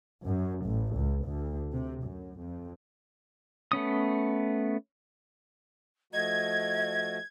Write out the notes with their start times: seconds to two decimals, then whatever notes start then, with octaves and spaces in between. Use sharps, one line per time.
0.24 F#2
0.65 A1
0.95 C#2
1.25 D2
1.72 C3
2.01 F#2
2.37 F2
3.72 A3 B3 C#4 D#6
6.13 F3 A3 F#4 D#5 G#6